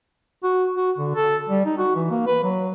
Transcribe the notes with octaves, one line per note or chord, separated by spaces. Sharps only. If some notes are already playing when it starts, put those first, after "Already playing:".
F#4
F#4
D3
A4
G3
D#4
F#4
E3
A#3
B4
F#3